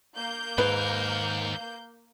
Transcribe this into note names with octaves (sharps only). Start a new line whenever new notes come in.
A#3 G6
D#2 G#2 A#4 B4